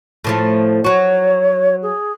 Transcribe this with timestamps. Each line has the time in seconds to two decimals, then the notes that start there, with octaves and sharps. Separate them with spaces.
0.24 A2 F3 A3
0.84 F#3 F#4 C#5
1.82 G#4